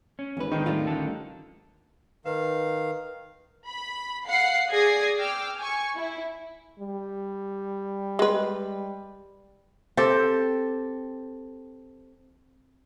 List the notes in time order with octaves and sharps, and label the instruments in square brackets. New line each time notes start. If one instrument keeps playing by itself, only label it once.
[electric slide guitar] C#4
[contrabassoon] G#1 [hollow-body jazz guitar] E2 B4
[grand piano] D#3 [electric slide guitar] D4 D#4
[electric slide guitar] E2 A2 A3 [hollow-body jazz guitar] G3 D#4 F4
[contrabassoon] A1 [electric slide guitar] D3 A5
[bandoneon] D#3 F5 [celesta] B4
[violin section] B5
F5 F#5 C7
G#4 D5 D#6 G#6 A#6 C7
G5 D6 E6 F6
G#5 C#6
E4
[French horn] G3
[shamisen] G#3 B4
[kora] C4 G4 A4